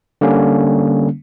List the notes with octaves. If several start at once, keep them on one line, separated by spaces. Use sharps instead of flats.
D3 G3 A#3 C#4